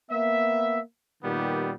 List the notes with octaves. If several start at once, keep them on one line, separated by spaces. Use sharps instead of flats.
A#3 B3 E5
A#2 D#3 G3 B3 G4